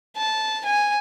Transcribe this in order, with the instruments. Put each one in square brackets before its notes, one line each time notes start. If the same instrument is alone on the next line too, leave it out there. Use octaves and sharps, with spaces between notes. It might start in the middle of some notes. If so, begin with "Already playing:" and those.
[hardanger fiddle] A5
G#5